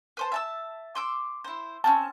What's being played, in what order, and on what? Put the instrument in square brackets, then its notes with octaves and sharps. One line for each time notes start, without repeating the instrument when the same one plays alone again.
[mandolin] B4 C5 A5
E5 A5 E6
C6 D6 E6
E4 C5
[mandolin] A#3 C4 C#4 [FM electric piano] A5